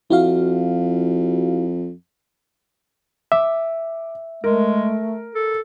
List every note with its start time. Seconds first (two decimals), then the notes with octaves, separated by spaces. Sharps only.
0.10 F2 E4 F#4 F5
3.32 E5 D6
4.44 G#3 A3 A#4
5.35 A4